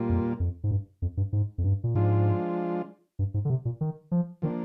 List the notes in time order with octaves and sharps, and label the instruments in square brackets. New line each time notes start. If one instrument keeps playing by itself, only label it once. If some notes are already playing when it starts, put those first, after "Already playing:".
Already playing: [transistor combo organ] A#2 G3 A#3 F4
[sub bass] F2
F2
G#2
G2
F2
G2
G#2
F2
G2
A#2
[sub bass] G#2 [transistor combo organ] F3 G#3 D4 F4
[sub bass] G2
G#2
D3
C3
A#2
D#3
F3
[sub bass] D#3 [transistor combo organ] F3 A#3 D4